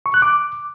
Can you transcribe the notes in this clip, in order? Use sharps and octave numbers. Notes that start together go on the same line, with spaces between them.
C#6
F#6
D6